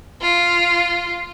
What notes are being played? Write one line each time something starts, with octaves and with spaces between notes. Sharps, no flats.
F4